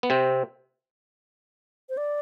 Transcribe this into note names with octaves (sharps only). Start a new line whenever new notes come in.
B3
C3 C4
C5
D5